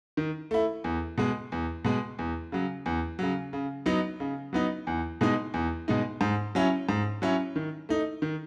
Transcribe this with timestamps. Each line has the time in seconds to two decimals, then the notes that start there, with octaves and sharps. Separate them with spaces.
0.17 D#3
0.51 A3 E4
0.84 E2
1.18 B2 G#3
1.52 E2
1.85 B2 G#3
2.19 E2
2.52 C#3 F#3
2.86 E2
3.19 C#3 F#3
3.53 C#3
3.86 F#3 B3 D#4
4.20 C#3
4.53 F#3 B3 D#4
4.87 E2
5.21 B2 G#3 D#4
5.54 E2
5.88 B2 G#3 D#4
6.21 G#2
6.55 F#3 C#4 E4
6.89 G#2
7.22 F#3 C#4 E4
7.56 D#3
7.89 A3 D#4
8.22 D#3